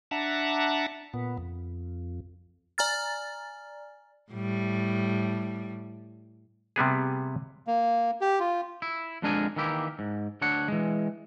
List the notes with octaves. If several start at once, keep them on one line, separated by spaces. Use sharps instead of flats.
D4 E5 F#5 A5 A#5
A#2 B3
F2
D5 G#5 A#5 F6 A6
A2 G3
C3 G3 B3 G#4
A#3
G4
F4
E4
F2 D3 G#3 D4 A#4 G#5
D#3 E3 A#3 E4 G4
G#2
D2 D4 C#5 F#5
E3 G#3